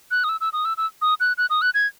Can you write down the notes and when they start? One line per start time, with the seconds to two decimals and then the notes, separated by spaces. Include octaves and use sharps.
0.11 F#6
0.24 D#6
0.29 E6
0.41 E6
0.53 D#6
0.65 E6
0.77 E6
1.02 D#6
1.20 F#6
1.38 F#6
1.50 D#6
1.62 F#6
1.74 G#6